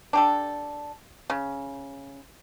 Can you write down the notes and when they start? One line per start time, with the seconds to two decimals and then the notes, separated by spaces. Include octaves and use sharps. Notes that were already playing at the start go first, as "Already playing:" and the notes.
0.13 D4 G4 A4
1.30 C#3